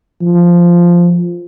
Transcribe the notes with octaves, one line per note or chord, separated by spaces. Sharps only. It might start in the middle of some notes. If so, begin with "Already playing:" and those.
F3